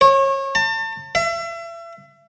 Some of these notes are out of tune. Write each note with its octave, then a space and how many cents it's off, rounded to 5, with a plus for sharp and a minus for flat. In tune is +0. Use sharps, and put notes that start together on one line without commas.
C#5 -30
A5 +35
E5 +35